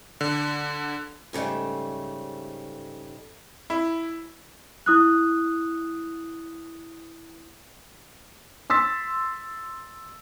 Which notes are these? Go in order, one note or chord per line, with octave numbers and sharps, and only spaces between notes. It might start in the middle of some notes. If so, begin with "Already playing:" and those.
D3
G#2 C#3 F#3 G3 A3
E4
E4 D#6 F#6
C6 E6 A6 B6